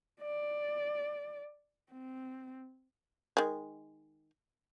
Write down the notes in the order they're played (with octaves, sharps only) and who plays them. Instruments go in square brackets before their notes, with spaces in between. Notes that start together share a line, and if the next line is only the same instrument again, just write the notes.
[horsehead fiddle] D5
C4
[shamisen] D#3 G#3